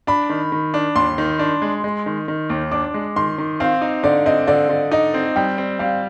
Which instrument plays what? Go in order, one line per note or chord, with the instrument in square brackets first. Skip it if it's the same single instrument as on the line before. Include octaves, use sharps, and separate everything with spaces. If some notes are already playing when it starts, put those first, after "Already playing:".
[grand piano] D4 [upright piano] B5
[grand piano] D#3
D#3
D4
[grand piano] D#2 [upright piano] C6
[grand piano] D#3
D4
G#3
G#3
D#3
D#3
D#2
[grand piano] D4 [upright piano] D6
[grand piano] G#3
[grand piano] D#3 [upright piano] C6
[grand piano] D#3
[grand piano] C4 [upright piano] F5
[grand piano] D#4
[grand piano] D3 [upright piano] D5
[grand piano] C4 [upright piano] D#5
[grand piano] D3 [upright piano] D5
[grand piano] D3
[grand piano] D#4 [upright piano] D#5
[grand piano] C4
[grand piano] G3 [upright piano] G5
[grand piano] C4
[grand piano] G3 [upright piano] F5